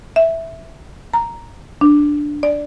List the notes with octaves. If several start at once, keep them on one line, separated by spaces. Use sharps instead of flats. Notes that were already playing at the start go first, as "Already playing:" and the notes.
E5
A#5
D4
D5